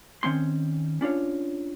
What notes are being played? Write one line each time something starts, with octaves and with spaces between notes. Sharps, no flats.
D#3 C4 C#4 C6
C#4 D4 F4 C#5